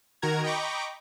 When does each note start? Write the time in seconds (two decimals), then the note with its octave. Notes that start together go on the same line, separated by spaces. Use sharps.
0.22 D#3 F#4 A#4 A#5 G#6
0.44 D#5 G5 A#5 B5 C#6 D6